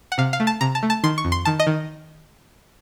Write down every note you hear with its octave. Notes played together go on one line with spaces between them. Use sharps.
F#5
C3 F5
F5
A3
A5
C3 A#5
A5
A3
A5
D#3 C6
C#6
F2
C6
D#3 A5
D#5
D#3